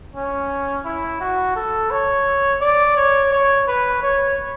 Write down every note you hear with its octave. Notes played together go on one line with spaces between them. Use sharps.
C#4
E4
F#4
A4
C#5
D5
C#5
C#5
B4
C#5